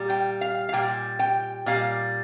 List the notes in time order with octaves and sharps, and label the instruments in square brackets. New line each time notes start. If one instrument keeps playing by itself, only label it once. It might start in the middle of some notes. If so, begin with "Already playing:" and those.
Already playing: [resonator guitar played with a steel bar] A#2 G3
G5
F5
F5
A#2 G3 G5
G5
A#2 G3 F5